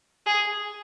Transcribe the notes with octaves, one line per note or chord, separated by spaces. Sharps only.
G#4